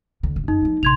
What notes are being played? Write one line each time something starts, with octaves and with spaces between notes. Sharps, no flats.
D2 D3
D1
F#2 D#4
F3 A#3
A#1 C3 C6 G#6 F7